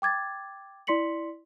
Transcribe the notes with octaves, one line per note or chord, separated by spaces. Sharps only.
G5 D6 G#6 A6
E4 D5 C6 B6 C#7 F#7